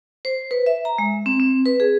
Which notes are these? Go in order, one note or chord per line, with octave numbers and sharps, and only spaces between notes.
C5
B4
E5
A#5
G#3
C4
C4
B4
G#4